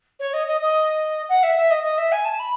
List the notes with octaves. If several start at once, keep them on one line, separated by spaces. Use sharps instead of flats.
C#5
D#5
D#5
D#5
F#5
E5
E5
D#5
D#5
E5
G#5
A5
B5